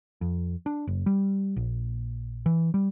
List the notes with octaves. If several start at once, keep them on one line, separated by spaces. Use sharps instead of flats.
F2
D4
F#1
G3
A#1
E3
G3